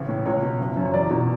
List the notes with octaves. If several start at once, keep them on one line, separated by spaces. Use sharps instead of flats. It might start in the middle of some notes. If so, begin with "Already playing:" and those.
Already playing: A1 C#3
A2
C#2 C#5
B2
F#1
F#2
C#5
E2 D5
B2